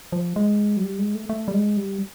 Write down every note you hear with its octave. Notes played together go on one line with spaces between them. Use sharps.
F3
G#3
F#3
G3
G#3
A3
A3
G3
G#3
G3